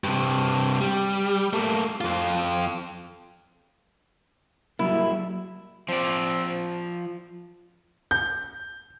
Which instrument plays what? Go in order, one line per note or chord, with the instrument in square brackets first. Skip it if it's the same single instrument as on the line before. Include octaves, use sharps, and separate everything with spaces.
[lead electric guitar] G2 C3
G3
A3 A#3
F2 F4
[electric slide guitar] F#3 G3 A#3 [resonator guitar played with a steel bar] E4
[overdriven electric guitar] F3 D5 [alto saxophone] C4
[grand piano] G6